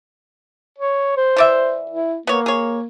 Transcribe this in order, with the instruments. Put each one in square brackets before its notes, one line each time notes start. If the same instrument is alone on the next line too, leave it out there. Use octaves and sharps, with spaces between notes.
[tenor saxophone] C#5
C5
[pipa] E3 D5 E5
[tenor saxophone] E4
[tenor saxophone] A#3 [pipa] B3 C#5
[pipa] G#4 C#5